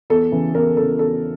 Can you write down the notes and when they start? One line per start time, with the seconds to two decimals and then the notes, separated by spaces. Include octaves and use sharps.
0.10 E2 A4
0.32 C#3 E3
0.54 E2 A#4
0.77 C#3 E3 A4
0.99 E2 A4